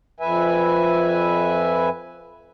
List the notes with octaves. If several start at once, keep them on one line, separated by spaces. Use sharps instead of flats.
F2 B4 E5 G#5